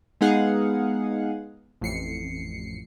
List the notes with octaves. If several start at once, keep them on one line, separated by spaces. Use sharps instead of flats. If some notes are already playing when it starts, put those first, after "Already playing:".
G#3 B3 D#4 G#4 F5 F#5
A1 F2 C7 C#7